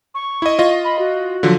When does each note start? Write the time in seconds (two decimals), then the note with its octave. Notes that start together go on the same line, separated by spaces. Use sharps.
0.15 C#6
0.42 E4 D#5
0.59 F4 D#5
0.84 B5
0.99 F#4
1.43 D3 F3 F#3